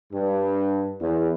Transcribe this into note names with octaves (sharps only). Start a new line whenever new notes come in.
G2
E2